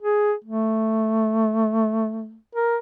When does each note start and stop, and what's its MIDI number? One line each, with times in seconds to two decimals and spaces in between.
0.02 0.33 68
0.44 2.37 57
2.55 2.77 70